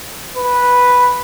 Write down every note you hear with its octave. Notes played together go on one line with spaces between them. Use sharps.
B4